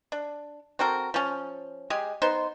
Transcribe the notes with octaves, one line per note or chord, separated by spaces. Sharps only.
D4
C4 F#4 A4 A#4
F3 C#4
G#3 G4 G#4 G#5
B3 D#4 C5 C6